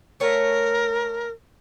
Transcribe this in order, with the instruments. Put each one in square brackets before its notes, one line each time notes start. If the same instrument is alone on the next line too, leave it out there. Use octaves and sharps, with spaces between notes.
[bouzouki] A3 C#5 F#5 [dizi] A#4